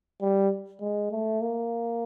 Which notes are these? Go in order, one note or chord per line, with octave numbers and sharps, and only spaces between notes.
G3
G#3
A3
A#3